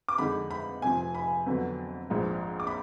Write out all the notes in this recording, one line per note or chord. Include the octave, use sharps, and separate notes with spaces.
D6
F2 D3 G#3 D#4 B5
B5
F1 F2 F3 G#5
B5
F2 D3 F#3 B3
A#1 G#2 F3
D6
B5